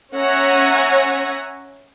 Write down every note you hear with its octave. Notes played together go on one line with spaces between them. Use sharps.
C#4 C#5 E5 F#5 G#5 A#5